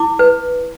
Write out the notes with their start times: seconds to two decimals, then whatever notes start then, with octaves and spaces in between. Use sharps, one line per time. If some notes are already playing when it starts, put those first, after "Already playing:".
Already playing: E4 D6
0.19 B4